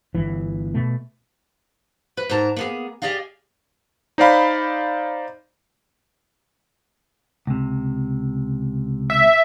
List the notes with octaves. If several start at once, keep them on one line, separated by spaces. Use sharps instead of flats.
G1 E3
B2 A3
B4
G#2 A#4 A5 A#5
A#3 B3 G#4
G4 G#4 D5 D#5 F5
D#4 C5 D5 F5 B5
C#2 C3
E5